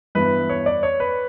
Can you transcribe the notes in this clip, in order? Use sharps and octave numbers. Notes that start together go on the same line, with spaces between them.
G2 E3 B3 E4 B4
C#5
D5
C#5
B4